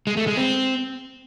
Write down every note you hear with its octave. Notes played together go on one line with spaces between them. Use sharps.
G#3
A3
G#3
C4